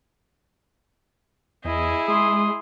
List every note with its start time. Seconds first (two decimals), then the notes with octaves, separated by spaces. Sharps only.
1.65 E2 E4 G#4 D#5
2.08 G#3 C6 D#6